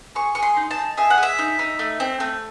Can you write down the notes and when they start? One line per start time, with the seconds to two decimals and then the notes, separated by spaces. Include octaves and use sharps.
0.15 G#4 C#6
0.35 G#4 C#6
0.43 C6
0.57 D#4
0.71 A5
0.78 D#4
0.97 G#4 E5
1.10 F#5
1.18 G#4
1.23 E5
1.39 D#4
1.59 D#4
1.79 A3
2.00 C4
2.20 A3